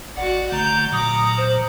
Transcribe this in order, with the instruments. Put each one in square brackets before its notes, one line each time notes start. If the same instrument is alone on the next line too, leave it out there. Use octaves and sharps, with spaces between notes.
[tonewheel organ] G#1 [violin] F#4 D5 [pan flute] F#5
[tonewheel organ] D3 A3 [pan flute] A#5 [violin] G6
[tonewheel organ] A#2 F#3 [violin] A#5 D6 [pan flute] D#6
[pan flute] C5